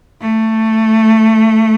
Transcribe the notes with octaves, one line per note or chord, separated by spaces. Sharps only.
A3